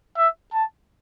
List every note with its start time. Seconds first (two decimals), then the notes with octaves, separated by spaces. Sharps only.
0.18 E5
0.53 A5